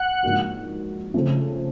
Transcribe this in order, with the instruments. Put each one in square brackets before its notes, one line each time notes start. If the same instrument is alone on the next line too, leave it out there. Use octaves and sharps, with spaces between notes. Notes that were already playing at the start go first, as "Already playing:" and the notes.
Already playing: [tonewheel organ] F#5
[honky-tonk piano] G#2 F3 A#3 D4 F#4
C#3 F3 A3 C4